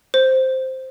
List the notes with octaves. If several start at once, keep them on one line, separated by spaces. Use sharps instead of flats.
C5